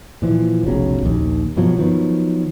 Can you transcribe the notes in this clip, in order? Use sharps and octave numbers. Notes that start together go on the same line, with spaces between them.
A#2 E3 F3
F1 B1 C#3 F#3
A#1 D#2
G2 B2 F3 F#3
D#3 F3 F#3 B3